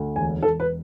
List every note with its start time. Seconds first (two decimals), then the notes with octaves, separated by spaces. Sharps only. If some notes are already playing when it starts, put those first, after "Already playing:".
Already playing: D2
0.16 E1 G#5
0.43 E1 A4
0.60 B4